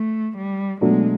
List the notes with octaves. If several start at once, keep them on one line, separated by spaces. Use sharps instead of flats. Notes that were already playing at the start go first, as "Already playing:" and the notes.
Already playing: A3
G3
B2 F#3 G#3 A3 D4